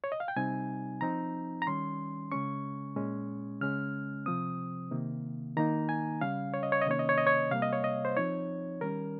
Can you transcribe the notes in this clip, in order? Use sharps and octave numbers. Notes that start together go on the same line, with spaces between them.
C#5
D#5
F5
G5
C3 G3 C4 D#4 G#5
F3 C4 D#4 A#5
A#5
D#3 G3 C#4 C6
C#3 G#3 C#4 C#6
A#2 G#3 C#4
C#3 G#3 C#4 F6
C3 F3 C4 D#6
C3 D#3 A#3
D#3 A#3 D#4 A#5
G#5
C#3 G3 C#4 F5
C#5
D#5
C#5
D#5
C3 D#3 A#3 C#4 C#5
D#5
C#5
D#5
C#5
C3 G3 A#3 F5
D#5
C#5
D#5
C5
F3 C4 D#4 C#5
D#3 G3 C#4 A#4